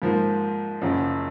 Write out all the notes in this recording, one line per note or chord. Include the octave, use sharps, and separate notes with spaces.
G#2 F3 A#3
F#1 F#2 C#3 F3